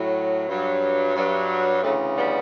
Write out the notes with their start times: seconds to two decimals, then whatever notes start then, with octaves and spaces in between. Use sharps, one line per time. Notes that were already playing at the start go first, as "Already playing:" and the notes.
Already playing: A2 F#3
0.47 G2 F#3
1.15 G2 F#3
1.82 D2 C#3 E3 F#3 A3
2.16 G3 B3